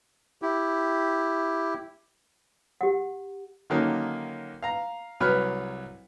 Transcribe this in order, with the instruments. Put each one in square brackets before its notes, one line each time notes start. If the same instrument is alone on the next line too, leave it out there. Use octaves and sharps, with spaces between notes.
[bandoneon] E4 G4
[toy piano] G4 F#5
[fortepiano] D3 D#3 F#3 A#3 C#4 D#4
F5 A#5
C2 F#3 B4 C#5 B5 F6